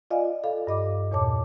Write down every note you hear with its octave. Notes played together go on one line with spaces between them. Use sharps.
F4 D5 D#5 F5 G#5
A4 F5
G2 D#5 D6
E2 A#2 C#5 A5 D6